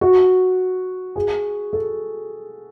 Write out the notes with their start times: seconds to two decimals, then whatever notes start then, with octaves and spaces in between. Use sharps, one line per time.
0.01 F#4
1.16 G#4
1.73 A4